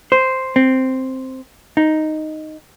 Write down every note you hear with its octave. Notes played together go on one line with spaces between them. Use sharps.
C5
C4
D#4